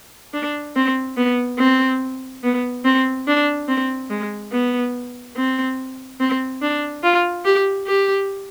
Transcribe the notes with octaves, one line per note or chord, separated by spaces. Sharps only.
D4
C4
B3
C4
B3
C4
D4
C4
G#3
B3
C4
C4
D4
F4
G4
G4